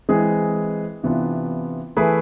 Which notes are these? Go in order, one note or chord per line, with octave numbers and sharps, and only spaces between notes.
E3 G#3 C4 G#4
C3 E3 B3 D4 F4
E3 A3 E4 G#4 B4